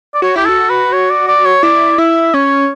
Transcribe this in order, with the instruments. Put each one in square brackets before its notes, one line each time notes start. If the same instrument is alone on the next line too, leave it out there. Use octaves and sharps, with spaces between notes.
[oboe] D5
[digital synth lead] F#4 [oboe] C#5
[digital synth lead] E4 [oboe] G4
[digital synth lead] F#4 [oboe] A4
[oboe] B4
C#5
D5
D5
C#5
[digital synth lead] E4 [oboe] D5
[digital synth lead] E4 [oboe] E5
[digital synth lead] C#4 [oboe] C#5